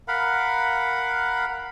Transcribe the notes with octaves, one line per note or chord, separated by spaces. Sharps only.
A#4 F5 F#5 B5